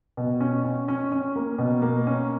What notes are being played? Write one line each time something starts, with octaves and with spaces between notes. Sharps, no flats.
B2
C#4
C#4
C#4
C#4
A#3
B2
A#3
C#4